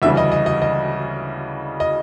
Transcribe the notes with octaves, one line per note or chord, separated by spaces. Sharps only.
D2 C#3 E3 G3 E5
D#5
D#5
D#5
D#5
D#5